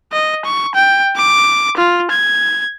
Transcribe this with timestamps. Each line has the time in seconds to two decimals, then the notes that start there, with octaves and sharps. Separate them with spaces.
0.13 D#5
0.45 C#6
0.75 G5
1.16 D6
1.77 F4
2.11 G#6